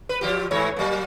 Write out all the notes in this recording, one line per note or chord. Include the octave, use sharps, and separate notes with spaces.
B4
F3 F4 G4
G#2 E3 C#5
F#3 A#3